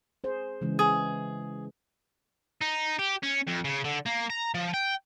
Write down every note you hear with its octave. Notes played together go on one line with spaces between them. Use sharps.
G#4 C5
C#3 E3 G#3
G#4
D#4
G4
C#4
F2
C#3
D3
A#3
A#5
F3
G5